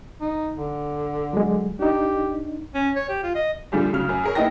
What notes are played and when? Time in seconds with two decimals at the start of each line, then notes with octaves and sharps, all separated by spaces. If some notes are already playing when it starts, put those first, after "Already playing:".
0.21 D#4
0.56 D3
1.33 F#3 G#3
1.79 D4 D#4 G4
2.75 C#4
2.96 C#5
3.09 G4
3.24 F4
3.36 D#5
3.72 A2 D3 F3 G3 G4 G#4
3.93 D2 C#3 F#3 F6
4.09 F#2
4.24 G#4 A#4 C#5
4.35 A#1 B3 E4 D#5 G5 A#6